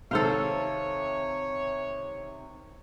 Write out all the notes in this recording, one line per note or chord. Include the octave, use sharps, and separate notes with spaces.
C3 D#3 A4 C5 C#5 F5